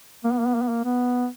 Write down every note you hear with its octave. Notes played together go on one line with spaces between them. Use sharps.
A#3
B3
A#3
B3
A#3
B3
A#3
B3